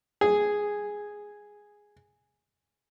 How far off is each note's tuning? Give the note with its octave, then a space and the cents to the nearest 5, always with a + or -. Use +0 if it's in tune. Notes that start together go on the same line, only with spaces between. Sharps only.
G#4 -5